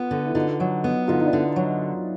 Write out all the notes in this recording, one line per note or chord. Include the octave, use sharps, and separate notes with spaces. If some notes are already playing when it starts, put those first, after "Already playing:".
Already playing: B3 F4
D3
E4
D3 D#4 F4
F#3
B3
D3 D#4 F4
D#4
D4 E4
D3
F#3